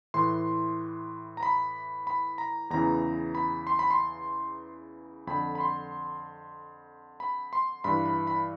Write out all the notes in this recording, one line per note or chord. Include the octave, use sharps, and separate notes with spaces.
A2 E3 C6
A#5
B5
B5
A#5
E2 C#3 E3 A#5
B5
C6
B5
C6
F2 D3 B5
B5
C6
B5
C6
G2 E3 B5
B5
B5